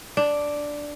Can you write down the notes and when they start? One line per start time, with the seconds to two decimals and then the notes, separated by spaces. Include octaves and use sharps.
0.17 D4